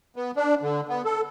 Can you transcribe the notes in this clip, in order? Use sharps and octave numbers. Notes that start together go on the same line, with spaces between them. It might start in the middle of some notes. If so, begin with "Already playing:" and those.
B3
D4
D3
B3
A4